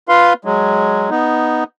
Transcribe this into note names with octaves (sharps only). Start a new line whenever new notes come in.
F4 B4 F5 C6
F#3 G#3
B3 D#4